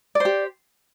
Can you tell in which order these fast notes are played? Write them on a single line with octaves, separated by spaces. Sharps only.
D5 C5 G4